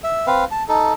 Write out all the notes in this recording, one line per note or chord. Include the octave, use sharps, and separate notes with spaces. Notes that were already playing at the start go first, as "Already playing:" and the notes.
E5
C4 B4 F5
A5
D#4 A4